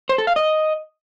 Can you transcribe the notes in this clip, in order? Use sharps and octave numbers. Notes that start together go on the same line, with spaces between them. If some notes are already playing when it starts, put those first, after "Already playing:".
C5
A4
F5
D#5